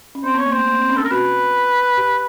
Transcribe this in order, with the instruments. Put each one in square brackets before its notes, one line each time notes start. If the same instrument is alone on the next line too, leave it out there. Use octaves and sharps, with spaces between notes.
[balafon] C#4
[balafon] C4 [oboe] C5
[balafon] B3 [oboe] C#5
[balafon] A#3
[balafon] A3 [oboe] C5
[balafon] A#3
C4
C#4
[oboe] A4
[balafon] D4 [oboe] A#4
[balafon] F#4 [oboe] B4
[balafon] G4